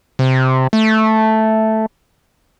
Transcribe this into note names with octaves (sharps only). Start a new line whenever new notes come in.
C3
A3